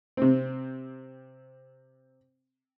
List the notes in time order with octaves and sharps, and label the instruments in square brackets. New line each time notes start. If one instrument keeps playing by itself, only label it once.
[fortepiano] C3 C4